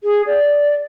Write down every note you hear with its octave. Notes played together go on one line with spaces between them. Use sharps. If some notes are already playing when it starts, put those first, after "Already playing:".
G#4
D5